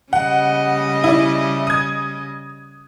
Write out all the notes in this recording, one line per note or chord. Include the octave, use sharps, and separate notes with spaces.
C#3 G3 D#5 F#5
E4 D5
D#6 G#6